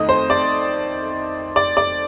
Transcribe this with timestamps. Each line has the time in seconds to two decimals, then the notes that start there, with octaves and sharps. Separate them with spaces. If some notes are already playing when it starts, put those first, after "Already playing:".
Already playing: F2 D#3 A3 D#5
0.09 C5
0.30 D5
1.56 D5
1.77 D5